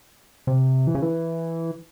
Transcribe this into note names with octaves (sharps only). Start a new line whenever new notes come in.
C3
E3
C#3
E3